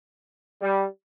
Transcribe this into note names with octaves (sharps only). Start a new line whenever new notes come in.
G3